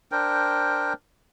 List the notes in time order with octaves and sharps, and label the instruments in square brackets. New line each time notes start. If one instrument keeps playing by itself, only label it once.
[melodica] D4 A#4 C5 G5